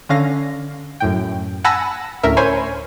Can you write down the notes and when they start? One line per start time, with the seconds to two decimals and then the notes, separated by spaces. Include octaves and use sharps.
0.09 D3 C#4 F5 A#6
1.00 F#2 A2 G5
1.64 F#5 G#5 A5 B5 E6 A#6
2.23 D2 A2 C#4 A#4 E5
2.37 C5 C#5 G#5 B5 C6